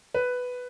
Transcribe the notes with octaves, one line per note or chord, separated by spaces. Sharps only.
B4